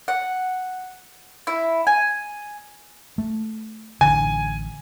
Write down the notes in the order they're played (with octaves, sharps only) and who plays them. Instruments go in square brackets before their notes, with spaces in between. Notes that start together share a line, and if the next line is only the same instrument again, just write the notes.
[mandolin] F#5
E4
G#5
[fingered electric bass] A3
[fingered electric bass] A1 D3 [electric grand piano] G#5